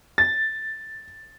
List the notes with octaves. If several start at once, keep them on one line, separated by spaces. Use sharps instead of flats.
A6